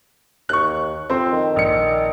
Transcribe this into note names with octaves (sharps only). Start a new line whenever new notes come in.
D#2 C#6 F#6
F2 C4 C6
D#3
A#1 C#7